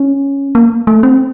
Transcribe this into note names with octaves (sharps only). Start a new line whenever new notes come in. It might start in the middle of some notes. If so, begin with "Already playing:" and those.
Already playing: C#4
A#3
A3
C4